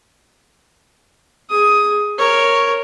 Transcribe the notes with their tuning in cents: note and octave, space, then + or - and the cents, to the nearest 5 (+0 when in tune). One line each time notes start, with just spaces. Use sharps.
G#4 +0 D#6 +10
A#4 +0 C#5 +0